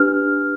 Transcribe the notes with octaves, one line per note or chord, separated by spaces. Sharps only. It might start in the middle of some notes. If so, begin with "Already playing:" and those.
Already playing: D4 G4 B4 F6